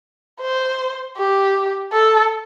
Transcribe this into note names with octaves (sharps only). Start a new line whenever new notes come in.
C5
G4
A4